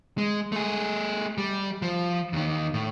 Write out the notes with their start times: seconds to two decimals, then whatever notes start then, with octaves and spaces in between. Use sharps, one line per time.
0.18 G#3
0.52 A3 G#4
1.38 G3
1.82 F3
2.33 D#2 D#3
2.74 A2